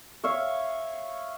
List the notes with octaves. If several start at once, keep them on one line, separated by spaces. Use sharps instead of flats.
C#5 E5 F5